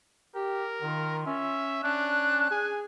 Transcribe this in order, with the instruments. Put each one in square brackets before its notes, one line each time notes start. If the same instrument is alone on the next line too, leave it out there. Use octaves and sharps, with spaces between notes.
[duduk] G4 [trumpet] A#4
[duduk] D#3 [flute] F4
[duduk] C#4 [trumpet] E5
[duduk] C#4 [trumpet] D4 [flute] F#6
[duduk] G#4 [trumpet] G#5